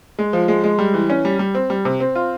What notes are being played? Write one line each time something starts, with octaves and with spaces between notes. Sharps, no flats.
G#3
F3
G#3
G#3
G3
E3
C#4
G3
G3
C4
G3
C3
C4
F4